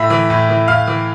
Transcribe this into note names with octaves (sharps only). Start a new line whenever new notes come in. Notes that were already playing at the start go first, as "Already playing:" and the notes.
Already playing: A2 E5 E6
E3
A2
E3
A2 F5 F6
E3